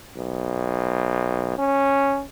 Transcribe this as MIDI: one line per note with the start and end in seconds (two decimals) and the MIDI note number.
0.17 1.57 35
1.58 2.22 61